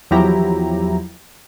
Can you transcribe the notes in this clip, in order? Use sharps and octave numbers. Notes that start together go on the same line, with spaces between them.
E2 F3 F#3 E4 G4 A#5